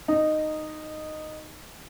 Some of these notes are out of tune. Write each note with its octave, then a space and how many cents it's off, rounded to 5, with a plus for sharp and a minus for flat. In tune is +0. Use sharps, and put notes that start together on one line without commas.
D#4 -10